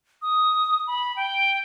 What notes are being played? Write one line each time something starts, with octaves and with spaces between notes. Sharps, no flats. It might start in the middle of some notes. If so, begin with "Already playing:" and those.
D#6
B5
G5